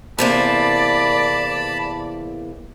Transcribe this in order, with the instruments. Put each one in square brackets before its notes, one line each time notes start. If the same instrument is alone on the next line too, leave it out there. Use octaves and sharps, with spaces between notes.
[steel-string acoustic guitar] E2 C3 A#3 [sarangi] D5 [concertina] A5 B5